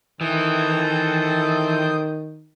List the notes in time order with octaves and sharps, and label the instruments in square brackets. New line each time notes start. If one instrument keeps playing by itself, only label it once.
[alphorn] D#3 [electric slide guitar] E3 [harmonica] C4 A4 [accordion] D#6 G6